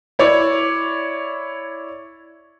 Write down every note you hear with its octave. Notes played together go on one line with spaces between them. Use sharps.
E4 C#5 D5